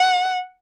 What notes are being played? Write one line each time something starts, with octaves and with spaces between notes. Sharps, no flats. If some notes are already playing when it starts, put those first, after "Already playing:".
Already playing: F#5